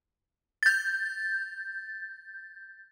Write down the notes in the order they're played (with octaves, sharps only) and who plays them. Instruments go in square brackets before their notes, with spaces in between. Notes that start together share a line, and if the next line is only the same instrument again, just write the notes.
[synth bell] G6 A6